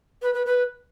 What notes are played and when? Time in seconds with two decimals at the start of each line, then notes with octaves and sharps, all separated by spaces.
0.22 B4
0.34 B4
0.46 B4